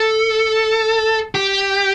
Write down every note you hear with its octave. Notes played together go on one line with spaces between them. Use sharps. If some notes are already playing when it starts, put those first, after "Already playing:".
Already playing: A4
G4